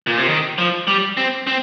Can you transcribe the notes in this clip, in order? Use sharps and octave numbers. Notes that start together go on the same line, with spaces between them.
A#2
C3
D#3
F3
G3
C4
C4